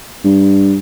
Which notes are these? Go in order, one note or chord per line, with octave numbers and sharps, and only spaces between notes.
G2